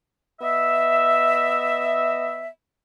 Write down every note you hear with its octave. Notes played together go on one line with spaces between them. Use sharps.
B3 D#5 E5